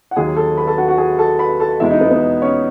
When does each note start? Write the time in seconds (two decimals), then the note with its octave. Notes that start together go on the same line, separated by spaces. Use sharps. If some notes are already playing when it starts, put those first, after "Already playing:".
0.11 F#5
0.16 D#2 D#3 F#3 G#4 G#5
0.36 A4 A5
0.57 B4 B5
0.67 A4 A5
0.78 F#4 F#5
0.88 F#4 F#5
0.98 G#4 G#5
1.19 A4 A5
1.39 B4 B5
1.60 A4 A5
1.80 E2 B2 G#3 E4 E5
1.91 D#4 D#5
2.01 B3 B4
2.11 B3 B4
2.42 C#4 C#5